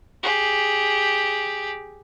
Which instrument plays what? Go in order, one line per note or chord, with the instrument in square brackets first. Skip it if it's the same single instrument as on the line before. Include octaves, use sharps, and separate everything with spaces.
[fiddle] G4 G#4